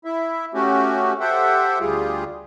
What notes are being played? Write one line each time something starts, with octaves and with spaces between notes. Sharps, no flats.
E4 E5
A3 C#4 F#4 G4
G4 A4 C5 E5 F#5 G5
D2 G3 F4 G4 G#4